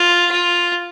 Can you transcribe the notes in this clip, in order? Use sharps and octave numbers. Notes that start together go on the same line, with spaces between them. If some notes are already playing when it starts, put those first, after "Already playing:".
Already playing: F4
F4